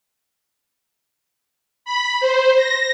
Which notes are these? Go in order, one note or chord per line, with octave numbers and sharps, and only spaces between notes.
B5
C5
A#6